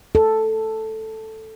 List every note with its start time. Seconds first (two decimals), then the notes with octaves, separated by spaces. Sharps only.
0.15 A4